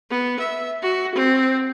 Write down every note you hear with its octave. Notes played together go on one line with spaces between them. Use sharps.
B3
E5
F#4
C4